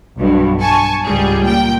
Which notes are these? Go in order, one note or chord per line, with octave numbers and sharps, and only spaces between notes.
B1 G2 B2
G#5 A5 C#6
C#2 G#2 G3 G#4
A#2 G5